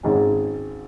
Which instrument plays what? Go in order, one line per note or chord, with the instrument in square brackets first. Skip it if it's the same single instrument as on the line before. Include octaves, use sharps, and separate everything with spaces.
[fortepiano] G#1 G#2 D#3 G#3 C#4